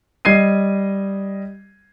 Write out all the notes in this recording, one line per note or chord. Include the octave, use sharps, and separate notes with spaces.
G3 D#5 G#6 C7 D#7